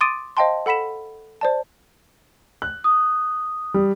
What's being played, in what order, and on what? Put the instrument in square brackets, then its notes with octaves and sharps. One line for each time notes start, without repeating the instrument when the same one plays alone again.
[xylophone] C6 D6 D#6 A6 D7 D#7
C5 D#5 F5 G5 A5 C6
A4 F#5 B5 B6 E7
C5 D5 A5
[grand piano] F#6
[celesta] D#6
[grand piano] G3